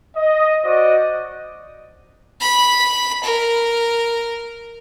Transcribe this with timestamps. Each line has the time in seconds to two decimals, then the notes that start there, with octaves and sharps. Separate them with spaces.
0.16 D#5
0.64 F#4 C5 D5 D#5
2.41 B5
3.24 A#4